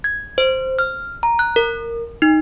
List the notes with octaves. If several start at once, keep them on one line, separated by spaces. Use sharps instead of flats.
G#6
C5
F6
A#5
F#6
A#4
D#4